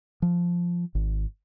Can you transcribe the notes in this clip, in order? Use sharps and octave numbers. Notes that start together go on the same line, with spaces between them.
F3
G#1